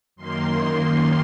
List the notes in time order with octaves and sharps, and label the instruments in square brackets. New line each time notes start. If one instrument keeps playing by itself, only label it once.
[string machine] F#2 D#3 A#3 C6